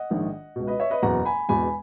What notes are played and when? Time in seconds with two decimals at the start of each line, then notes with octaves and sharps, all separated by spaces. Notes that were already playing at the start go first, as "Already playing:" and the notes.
Already playing: D#5 F#5
0.10 A#1 G#2 D#3
0.56 C#2 B2
0.67 B4 D#5
0.80 C#5 E5
0.90 B4 D#5
1.02 F#1 E2 B2 F#5 A#5
1.25 G#5 B5
1.49 E1 E2 B2 G#5 B5